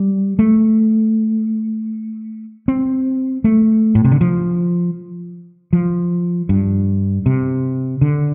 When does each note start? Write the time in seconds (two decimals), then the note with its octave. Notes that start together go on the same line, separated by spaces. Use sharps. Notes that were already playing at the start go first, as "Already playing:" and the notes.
Already playing: G3
0.39 A3
2.68 C4
3.44 A3
3.95 A2
4.04 C3
4.12 D3
4.21 F3
5.73 F3
6.49 G2
7.26 C3
8.01 D3